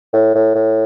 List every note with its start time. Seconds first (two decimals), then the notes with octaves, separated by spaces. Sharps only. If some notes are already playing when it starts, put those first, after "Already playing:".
0.13 A2
0.35 A2
0.55 A2